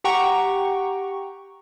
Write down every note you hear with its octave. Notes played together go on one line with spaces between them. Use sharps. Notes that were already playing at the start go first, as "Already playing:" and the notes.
G4 F#5 G5 A#5 C#6